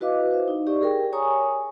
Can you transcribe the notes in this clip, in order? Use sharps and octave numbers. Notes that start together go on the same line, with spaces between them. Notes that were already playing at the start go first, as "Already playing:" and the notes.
E4 F#4 B4 D#5 F5 D6
C5 E5
D#4
G4 D5 E5 C#6
G#4 A#4 G5
C#5 G#5 A#5 C#6 D#6